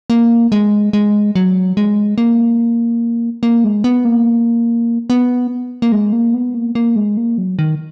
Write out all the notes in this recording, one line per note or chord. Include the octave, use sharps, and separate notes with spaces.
A#3
G#3
G#3
F#3
G#3
A#3
A#3
G#3
B3
A#3
B3
A#3
G#3
A#3
B3
A#3
A#3
G#3
A#3
F#3
D#3